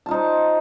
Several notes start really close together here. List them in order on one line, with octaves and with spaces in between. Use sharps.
A5 F4 D#4 C5